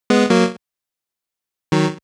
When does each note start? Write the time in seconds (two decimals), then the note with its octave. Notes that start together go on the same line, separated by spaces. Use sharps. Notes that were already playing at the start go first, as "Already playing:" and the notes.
0.10 G#3 B3
0.30 F#3 A#3
1.72 D#3 F#3